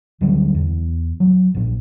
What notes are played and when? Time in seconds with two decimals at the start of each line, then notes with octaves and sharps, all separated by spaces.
0.21 D2 D3 F#3 G3
0.55 E2
1.20 F#3
1.54 A#1 A#2